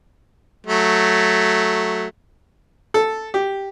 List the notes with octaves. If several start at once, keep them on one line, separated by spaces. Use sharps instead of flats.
F#3 A3
A4
G4